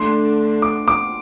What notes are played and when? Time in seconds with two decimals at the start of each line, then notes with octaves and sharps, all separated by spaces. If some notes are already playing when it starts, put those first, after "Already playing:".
Already playing: D3 A3 D4 C6
0.62 D6
0.88 D6